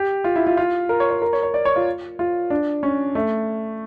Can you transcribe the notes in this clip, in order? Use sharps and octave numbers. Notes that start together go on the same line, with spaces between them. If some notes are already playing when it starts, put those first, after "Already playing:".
Already playing: G4
F4
E4
F4
F4
A#4
C#5
C#5
A#4
C#5
C#5
D5
C#5
F4
F4
D4
C#4
A3